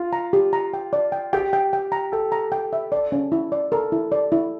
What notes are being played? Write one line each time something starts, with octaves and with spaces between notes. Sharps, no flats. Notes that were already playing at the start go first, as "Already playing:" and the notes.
Already playing: F4
A#5
G4
A#5
G5
D5
G5
G4 G5
G5
G5
A#5
A4 G5
A#5
G5
E5
D5
C#4
E4
D5
A4 A#4
E4
D5
E4